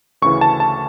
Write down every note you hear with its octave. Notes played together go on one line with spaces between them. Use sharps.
D2 C#3 E3 C#6
A5
A5